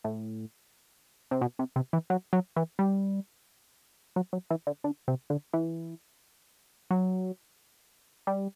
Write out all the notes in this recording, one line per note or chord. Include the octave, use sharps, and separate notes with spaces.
A2
C3
B2
C3
C3
E3
F#3
F#3
E3
G3
F#3
F#3
E3
D3
D3
C3
D3
E3
F#3
G3